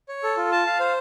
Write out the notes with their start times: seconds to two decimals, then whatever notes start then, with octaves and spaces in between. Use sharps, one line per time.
0.09 C#5
0.23 A4
0.37 F4
0.52 A5
0.66 F5
0.80 C5